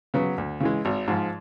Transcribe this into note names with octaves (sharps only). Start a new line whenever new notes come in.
C#3 F#3 B3
D2
C#3 E3 G#3
G#1
G#2 F3